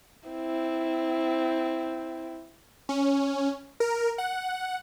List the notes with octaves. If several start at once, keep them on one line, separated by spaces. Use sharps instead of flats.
C4 E4
C#4
A#4
F#5